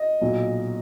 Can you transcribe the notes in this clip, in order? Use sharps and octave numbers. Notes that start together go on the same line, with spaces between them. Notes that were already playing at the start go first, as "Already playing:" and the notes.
Already playing: D#5
B1 A#2 F#3